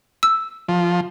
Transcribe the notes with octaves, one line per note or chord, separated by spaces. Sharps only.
E6
F3